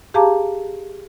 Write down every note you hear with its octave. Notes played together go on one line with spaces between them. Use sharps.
G4 G#4 F5 A5 A#5 D6